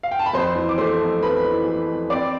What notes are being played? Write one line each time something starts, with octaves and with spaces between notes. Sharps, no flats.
F5
G5
A5
B5
F2 C5 C6
E3
D6
A3 C5 C6
F2
F2 B4 B5
E3
A3
F2
C4 D5 D6